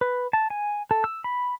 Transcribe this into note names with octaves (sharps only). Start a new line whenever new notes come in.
B4
A5
G#5
A4
E6
B5